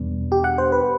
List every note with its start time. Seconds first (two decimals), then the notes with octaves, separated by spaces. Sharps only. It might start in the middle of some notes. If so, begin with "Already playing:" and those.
Already playing: E2 B2 G3 B3 D4
0.32 G4
0.44 F#5
0.58 C5
0.72 B4